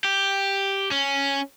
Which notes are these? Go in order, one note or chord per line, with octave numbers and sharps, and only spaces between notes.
G4
C#4